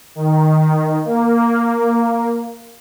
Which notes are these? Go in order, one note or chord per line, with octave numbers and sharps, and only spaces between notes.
D#3
A#3